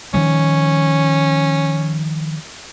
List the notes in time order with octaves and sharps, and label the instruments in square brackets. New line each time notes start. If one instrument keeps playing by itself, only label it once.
[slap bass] D#3 F3 G3 [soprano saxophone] C#4